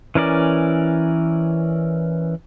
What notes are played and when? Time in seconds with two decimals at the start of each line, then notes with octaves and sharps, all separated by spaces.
0.15 E3 C#4 A#4 D5